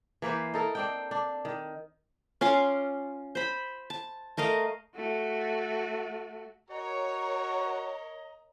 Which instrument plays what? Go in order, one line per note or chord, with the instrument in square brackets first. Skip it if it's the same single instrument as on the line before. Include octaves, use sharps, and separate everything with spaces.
[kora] E3 A#3 B4 C5
D#4 A4 A#4
C4 D4 G5
D4
D#3
[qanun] C#4 F4 C6 D6
C5 B5
A5
A3 A#4 D#5 F5
[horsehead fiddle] A3 F#4
[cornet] F#4 [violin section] A#4 C#5 [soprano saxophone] D#5 [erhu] A#5